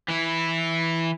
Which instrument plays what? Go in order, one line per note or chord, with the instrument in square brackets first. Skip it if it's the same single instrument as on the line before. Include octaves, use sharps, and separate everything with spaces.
[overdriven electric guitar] E3 E4